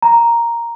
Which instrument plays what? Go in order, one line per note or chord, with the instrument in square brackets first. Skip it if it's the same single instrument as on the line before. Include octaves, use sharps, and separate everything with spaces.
[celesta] A#5